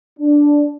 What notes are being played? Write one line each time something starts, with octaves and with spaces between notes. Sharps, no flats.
D4